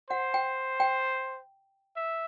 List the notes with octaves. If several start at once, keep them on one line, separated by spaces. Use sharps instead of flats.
C5 F#5
G5
G5
E5